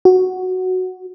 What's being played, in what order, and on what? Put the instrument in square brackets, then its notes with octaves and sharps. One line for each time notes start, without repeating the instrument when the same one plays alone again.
[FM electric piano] F#4